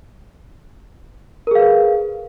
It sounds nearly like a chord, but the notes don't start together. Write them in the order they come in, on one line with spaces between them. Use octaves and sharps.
A#4 G#4 F5 B4